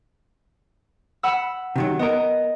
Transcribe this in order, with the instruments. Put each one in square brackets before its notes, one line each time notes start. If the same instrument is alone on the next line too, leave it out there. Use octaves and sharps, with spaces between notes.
[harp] F#5 B5 E6
[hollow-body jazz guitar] C3 D#3 F#3
[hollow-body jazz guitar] B3 A#4 [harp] D#5